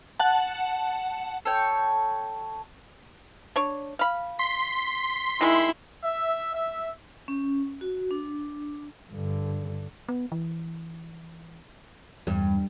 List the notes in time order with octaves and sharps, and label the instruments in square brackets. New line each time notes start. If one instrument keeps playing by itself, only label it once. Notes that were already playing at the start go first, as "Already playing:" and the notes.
[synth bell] F#5 A5
[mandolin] A4 C#5 G5
[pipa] D4 C#5
F5 B5
[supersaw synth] C6 B6
[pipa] D#3 G#3 [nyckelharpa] E4 E5
[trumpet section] E5
E5
[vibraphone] C#4
F#4
D4
[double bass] G2 D3
[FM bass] B3
E3
[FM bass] E2 [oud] G2